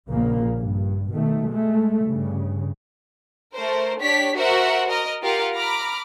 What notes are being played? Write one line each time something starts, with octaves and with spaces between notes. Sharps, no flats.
A#1 C#3 A#3
G2
B2 D#3 A3
G#3 A3
G2 C#3
A3 A#4 C5
D4 G4 C#5 B6
F#4 A#4 C5 E5 F#5
A#4 D#5 F6
F4 G4 A#4 F5 F#5
A#5 B5 D6 F6